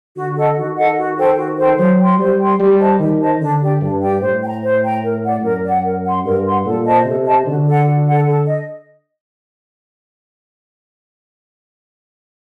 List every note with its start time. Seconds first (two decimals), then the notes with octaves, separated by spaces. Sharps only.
0.16 D3 F#4
0.36 A4 D#5 F#5
0.56 D#3 F#4
0.77 A4 D#5 F#5
0.97 F#4
1.17 A4 C5 G5
1.37 F#4
1.58 A4 C5 G5
1.78 F#3 C5
1.98 G5 C6
2.19 G3 C5
2.39 G5 C6
2.59 G3 G4
2.79 C5 D#5 A5
2.99 D#3 G4
3.20 C5 D#5 A5
3.40 D3 D4
3.61 G4 D5 G5
3.81 G2 D4
4.02 G4 D5 G5
4.21 A2 C5
4.41 G5
4.46 A#5
4.63 C5
4.83 G5 A#5
5.03 A#4
5.23 D5 F#5
5.43 F#2 A#4
5.63 D5
5.68 F#5
5.84 A#4
6.04 F#5 C6
6.24 G2 A#4
6.45 F#5 C6
6.65 A#2 A4
6.86 C5 D#5 A5
7.05 C3 A4
7.26 C5 D#5 A5
7.46 D3 F#4
7.66 A4 D5 F#5
7.86 F#4
8.07 A4 D5 F#5
8.27 A4
8.47 D#5